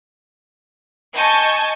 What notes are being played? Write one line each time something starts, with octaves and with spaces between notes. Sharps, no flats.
D#5 G#5 A5 C#6 G6 G#6